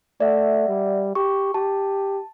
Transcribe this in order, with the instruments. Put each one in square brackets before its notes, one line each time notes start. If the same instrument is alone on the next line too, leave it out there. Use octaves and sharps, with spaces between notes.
[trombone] A3 [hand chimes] D5 E5 F#5
[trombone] G3
[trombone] G4 [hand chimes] C#6
[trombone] G4 [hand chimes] A5